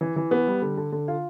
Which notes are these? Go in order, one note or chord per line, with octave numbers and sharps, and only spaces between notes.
E3
E3
B3
G3
D3
D3
D3
F4